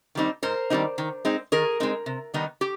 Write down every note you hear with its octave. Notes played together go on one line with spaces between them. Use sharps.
D#3 G3 C4 D#4
G#2 A#4 C5
D#3 G3 C4 D#4
D#3
G#3 C4 D#4
D#3 G#4 A#4
G#3 C4 D#4
C3
D#3 G3 B3 D#4
G4